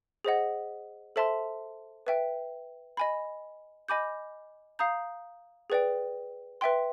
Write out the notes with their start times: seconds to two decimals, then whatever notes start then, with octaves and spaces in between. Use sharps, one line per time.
0.25 G#4 C5 D#5 F#5
1.16 A4 C5 E5 A5 C6
2.07 B4 E5 G5
2.97 D#5 G#5 B5
3.88 D#5 G#5 B5 D6 G6
4.79 F5 A#5 D#6 G6
5.70 G#4 B4 D5 G5
6.61 B4 E5 G5 C6